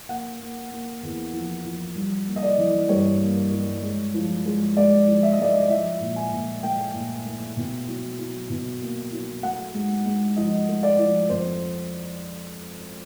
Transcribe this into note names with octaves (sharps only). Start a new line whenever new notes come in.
A#3 F#5
A#3
A#3
E2
F3
F3
G3
A#3
D#5
D5
E3
G2 C#5
A#3
G3
G#3
F3
G#3
G#2 D5
F3
E5
D#5
G#2 D5
D#5
F3 E5
A#2
G#5
A#2
A3 G5
A#2
A3
B2
F#3
F#3
B2
A#3
F#3
A3 F#5
G#2
G#2
F3 D#5
A3
D5
F3
F2 C5